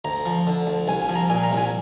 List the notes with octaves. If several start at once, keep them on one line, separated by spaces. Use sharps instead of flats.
D2 A#5
F3
D3
D2
C2 G#5
G#5
F3
A#5
A#2 G#5
A#5
C2
G#5